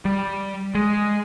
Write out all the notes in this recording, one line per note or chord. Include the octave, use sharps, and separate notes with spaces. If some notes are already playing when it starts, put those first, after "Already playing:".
G3
G#3